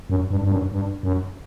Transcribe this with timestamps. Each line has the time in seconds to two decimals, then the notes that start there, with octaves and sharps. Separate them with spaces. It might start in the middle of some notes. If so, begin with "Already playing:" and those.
0.10 F#2
0.30 G2
0.44 G2
0.52 F#2
0.72 G2
1.03 F#2